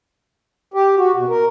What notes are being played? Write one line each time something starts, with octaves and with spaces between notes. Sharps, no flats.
G4
F#4
B2
A#4